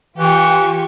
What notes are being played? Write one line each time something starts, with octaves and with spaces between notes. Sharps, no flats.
E3 F4 G4 C#6